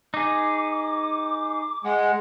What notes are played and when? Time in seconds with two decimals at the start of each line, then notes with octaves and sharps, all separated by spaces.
0.14 D#4 G#4 D6
1.84 G#3 F#5